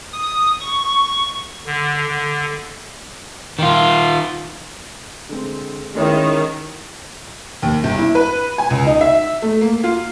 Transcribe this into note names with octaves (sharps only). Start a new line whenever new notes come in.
D#6
C#6
D3
D3
D#3 F4
D3 G#3 C4
D#3 G#3 C#4 E4
D#2
G1
E4
B4
G#5
C#2
D#4
E5
A3
A#3
F4